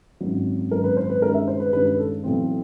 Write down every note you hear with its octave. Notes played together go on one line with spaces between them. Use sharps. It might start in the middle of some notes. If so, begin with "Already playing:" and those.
G#1 F#2 D#3 F#3
G#1 F#2 D#3 F#3 A#4
B4
C5
B4
G2 D#3 G#3 C#4 A#4
E5
C5
B4
G2 D#3 G#3 C#4 B4
B4
A4
B1 A2 E3 A3 C4